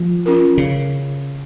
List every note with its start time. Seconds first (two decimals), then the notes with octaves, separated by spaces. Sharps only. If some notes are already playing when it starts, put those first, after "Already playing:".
Already playing: F3
0.26 C#4 F4 A#4
0.58 C#3